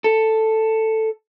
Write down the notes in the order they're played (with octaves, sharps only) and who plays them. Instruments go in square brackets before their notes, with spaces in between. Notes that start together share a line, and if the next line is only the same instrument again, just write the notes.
[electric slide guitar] A4